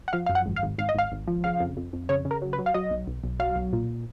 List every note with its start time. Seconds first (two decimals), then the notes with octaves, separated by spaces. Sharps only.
0.08 F#5
0.13 F3 F5
0.26 F#2 F5
0.35 F#5
0.46 G#1
0.56 F5
0.63 G#1
0.78 G#1 F5
0.89 D#5
0.95 G#1 F5
1.12 G#1
1.27 F3
1.44 C#3 F5
1.60 F2
1.77 F2
1.93 F2
2.09 C#3 C#5
2.25 C#3
2.31 A#4
2.42 F#3
2.53 B4
2.58 F#3
2.66 F5
2.74 F#3 D#5
2.91 B1
3.07 B1
3.24 B1
3.39 F#3 F5
3.56 B1
3.73 A#2